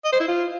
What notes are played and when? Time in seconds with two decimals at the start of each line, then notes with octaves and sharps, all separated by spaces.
0.05 D#5
0.13 C5
0.20 E4
0.28 F4